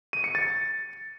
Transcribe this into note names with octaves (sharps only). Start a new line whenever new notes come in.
D#7
C#7
A6